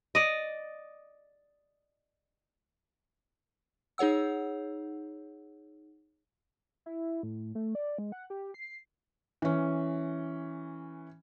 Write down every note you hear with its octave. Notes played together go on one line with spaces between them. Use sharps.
D5 D#5
D#4 G#4 C#5 F#5 E6
E4
A2
A3
D5
G#3
F#5
G4
C7
E3 C#4